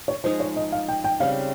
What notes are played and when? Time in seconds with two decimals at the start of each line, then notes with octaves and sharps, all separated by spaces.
0.08 C#5
0.24 F3 G#3 D#4 G#4 C5
0.40 C#5
0.56 D#5
0.72 F5
0.88 G5
1.04 G5
1.20 C#3 G3 C4 F5